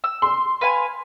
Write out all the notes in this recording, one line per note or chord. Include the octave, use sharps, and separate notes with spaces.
E6
C6
B4 F5 G#5